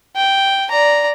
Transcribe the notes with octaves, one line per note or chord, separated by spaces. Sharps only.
G5
D5 A#5